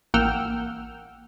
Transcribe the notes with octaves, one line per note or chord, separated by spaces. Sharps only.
A1 A#3 F#5 G5 E6 F6